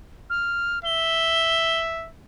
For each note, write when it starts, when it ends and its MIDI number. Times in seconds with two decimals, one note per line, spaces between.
0.30 0.79 89
0.85 2.09 76
0.85 1.80 103